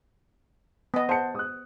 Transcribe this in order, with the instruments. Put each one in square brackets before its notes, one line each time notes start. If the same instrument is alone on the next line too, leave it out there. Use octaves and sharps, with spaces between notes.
[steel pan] B3 D#5
[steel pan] C5 [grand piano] F#5 A5 C#7
[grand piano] D#6 F#6